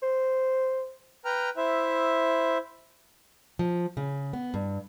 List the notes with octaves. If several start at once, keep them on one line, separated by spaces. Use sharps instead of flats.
C5
B4 G5 A#5 F6
E4 C5 E5
F3
C#3
B3
G2